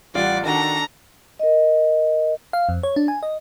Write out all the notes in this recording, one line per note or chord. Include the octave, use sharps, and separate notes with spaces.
A1 G3 F4 D5 F#5
D#3 D4 F#4 A4 A#5
A#4 D#5
F5
F2
C#5
D4
G#5
D#5